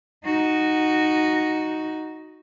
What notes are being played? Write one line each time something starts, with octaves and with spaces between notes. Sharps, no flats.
D#4 F#4